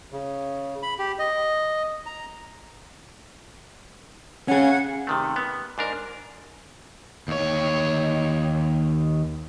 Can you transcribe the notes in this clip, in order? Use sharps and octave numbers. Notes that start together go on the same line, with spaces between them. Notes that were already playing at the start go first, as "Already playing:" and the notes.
C#3
B5
G4
D#5
A#5
C#4 G#4 F#5 G#6
C3 D#3 A3
B3
G#2 D4 A#4
D#2 C#5